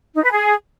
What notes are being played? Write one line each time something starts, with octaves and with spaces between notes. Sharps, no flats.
D#4
B4
G#4